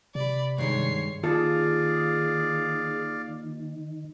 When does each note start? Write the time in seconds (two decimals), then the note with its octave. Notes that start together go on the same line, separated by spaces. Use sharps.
0.15 C3 D5 B5
0.58 G2 D#3 G#3 C#5 C7
1.23 D#2 D#3 F4 G#4 A4 D5 F5